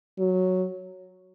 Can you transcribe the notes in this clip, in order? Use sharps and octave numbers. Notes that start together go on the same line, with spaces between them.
F#3